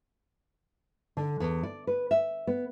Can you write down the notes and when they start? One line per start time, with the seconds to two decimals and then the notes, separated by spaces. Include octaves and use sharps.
1.17 D3
1.40 E2
1.63 D5
1.87 B4
2.11 E5
2.47 B3